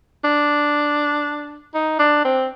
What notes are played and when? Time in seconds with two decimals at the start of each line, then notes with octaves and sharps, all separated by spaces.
0.24 D4
1.74 D#4
1.99 D4
2.25 C4